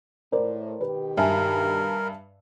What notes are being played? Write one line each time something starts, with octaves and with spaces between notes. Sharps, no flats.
A2 A#4 C5 D5
B2 D#3 G4 B4
G2 A#4 E5 G#5 A5